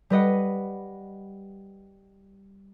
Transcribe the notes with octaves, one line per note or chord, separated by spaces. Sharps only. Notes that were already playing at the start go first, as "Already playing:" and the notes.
G3 B4 D#5 F#5